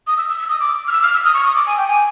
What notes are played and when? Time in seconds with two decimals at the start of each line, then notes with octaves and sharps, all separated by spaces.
0.07 D#6
0.18 E6
0.29 E6
0.39 E6
0.49 D#6
0.60 D6
0.88 F6
0.91 E6
1.03 F6
1.13 E6
1.24 D#6
1.34 C#6
1.45 D#6
1.55 D6
1.67 G#5
1.77 G5
1.88 G#5